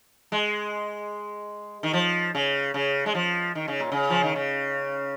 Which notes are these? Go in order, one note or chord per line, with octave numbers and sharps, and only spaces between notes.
G#3
D#3
F3
C#3
C#3
G#3
F3
D#3
C#3
A#2
C#3
F3
D#3
C#3